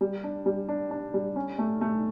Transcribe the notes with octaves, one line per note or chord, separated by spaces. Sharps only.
G3
D4
G3
D4
D4
G3
C#4
A3
A3